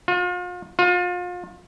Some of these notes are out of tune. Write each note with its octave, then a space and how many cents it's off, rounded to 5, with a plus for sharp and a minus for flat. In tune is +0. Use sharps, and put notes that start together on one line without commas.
F4 +40
F4 +35